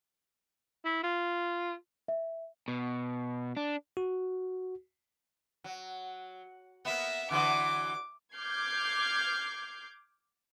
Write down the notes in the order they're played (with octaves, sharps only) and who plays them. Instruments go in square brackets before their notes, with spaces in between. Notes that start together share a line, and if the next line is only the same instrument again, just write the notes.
[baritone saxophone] E4
F4
[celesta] E5
[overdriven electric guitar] B2
D4
[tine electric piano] F#4
[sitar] F#3
[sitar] A#3 B3 [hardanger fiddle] E5
[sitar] D3 E3 F#3 [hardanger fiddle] D6
[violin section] D6 F6 G6 G#6 C7